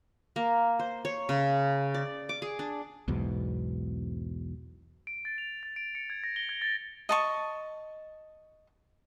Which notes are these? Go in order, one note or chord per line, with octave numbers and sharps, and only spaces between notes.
A#3
C5
C#5
C#3
D5
D6
G#4
D4
B1 E2 G#2 B2
D7
A6
F7
A6
D7
C#7
G#6
A#6
G7
G#6
A6
D#5 A5 C#6